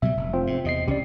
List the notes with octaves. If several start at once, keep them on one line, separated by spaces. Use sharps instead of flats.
B2 F#3 G3 E5
F1
C4 F4
G#2
E2 C3 D#5 C7
C2 C#4 G4 D5